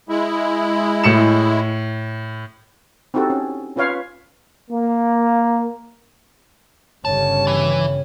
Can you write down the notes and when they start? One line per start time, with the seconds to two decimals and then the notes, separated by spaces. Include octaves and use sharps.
0.09 G#3 E4
1.04 A2 C#7 E7
3.14 C4 D#4 E4 F#4 G4 A4
3.30 C#4
3.76 C#4 F4 B4 C#5 F5
4.71 A#3
7.05 G1 C#3 G3 C#5 A5
7.47 E3